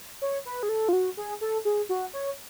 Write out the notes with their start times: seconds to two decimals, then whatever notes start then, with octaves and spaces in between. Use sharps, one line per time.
0.22 C#5
0.45 B4
0.63 G#4
0.69 A4
0.89 F4
0.93 F#4
1.17 G#4
1.41 A4
1.65 G#4
1.89 F#4
2.13 C#5